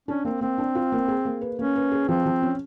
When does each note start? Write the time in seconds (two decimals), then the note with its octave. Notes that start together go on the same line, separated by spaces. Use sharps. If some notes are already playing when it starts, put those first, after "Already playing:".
0.08 C#4 D4
0.25 A#3 C4
0.41 A#3 C4
0.58 D4
0.75 F4
0.92 A#3
1.08 G#4
1.25 A#3
1.41 B4
1.59 A#3 C#4
1.76 B4
1.92 G#4
2.08 F3 C4
2.26 F3
2.43 C#4